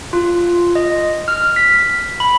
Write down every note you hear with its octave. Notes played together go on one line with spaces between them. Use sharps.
F4
D#5
F6
B6
B5